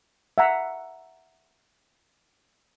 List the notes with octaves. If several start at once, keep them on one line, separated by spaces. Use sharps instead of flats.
E5 F#5 A#5